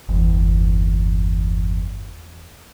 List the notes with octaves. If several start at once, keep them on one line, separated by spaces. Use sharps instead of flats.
G1 E2